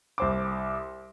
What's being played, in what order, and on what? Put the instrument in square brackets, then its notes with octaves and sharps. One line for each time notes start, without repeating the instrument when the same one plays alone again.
[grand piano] C2 C5 D6